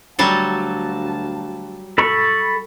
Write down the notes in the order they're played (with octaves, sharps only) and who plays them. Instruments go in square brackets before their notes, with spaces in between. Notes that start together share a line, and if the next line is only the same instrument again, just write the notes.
[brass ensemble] D2 F5 A5 [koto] F#3 G3 A4
[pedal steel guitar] A4 B5 C#6